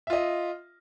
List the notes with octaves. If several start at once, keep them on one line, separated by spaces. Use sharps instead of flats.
F4 D#5 E5